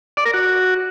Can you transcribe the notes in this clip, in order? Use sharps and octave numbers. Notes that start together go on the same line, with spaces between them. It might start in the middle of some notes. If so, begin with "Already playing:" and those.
D5
A#4
F#4